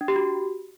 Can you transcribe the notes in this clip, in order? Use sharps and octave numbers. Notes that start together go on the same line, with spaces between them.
D4
G4
F#4